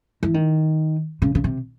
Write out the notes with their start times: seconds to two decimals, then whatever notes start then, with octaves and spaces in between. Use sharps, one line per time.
0.23 E3
0.34 D#3
1.22 C#3
1.35 C#3
1.44 C3